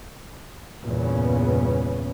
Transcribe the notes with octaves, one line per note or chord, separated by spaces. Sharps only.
E2 G2 A#2 C#3 B3 C#4